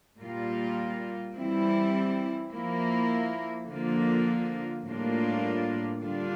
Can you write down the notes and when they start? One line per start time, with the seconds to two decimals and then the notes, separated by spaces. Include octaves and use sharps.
0.20 A#2 G3 A#3 F4
1.36 E3 G3 C4 E4
2.53 F3 A#3 E4
3.68 D3 F3 A#3 F4
4.85 A2 G3 A#3 D4 F4
6.00 D3 G3 D4 F4